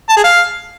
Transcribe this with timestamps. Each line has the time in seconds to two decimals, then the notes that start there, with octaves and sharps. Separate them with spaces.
0.09 A5
0.17 G#4
0.24 F5